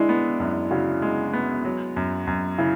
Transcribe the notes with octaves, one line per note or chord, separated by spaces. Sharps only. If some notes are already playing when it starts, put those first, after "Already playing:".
Already playing: G#3 D4 E4
B3
F#2
C#3 F#4
G#3
B3
F#3
F#2
F#2
C#3 E4